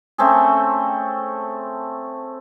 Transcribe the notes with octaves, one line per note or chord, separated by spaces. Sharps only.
A3 C4 C#4 G#4